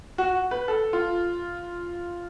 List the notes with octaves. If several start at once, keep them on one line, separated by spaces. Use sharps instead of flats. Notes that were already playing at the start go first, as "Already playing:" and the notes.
F#4
B4
A4
F4